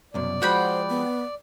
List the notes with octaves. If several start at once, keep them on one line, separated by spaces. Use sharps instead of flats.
C2 F#2 B2 D5
F3 G#3 F#4 C5 F#5 G5 B5
B3